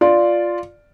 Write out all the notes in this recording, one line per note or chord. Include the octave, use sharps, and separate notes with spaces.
F4 D5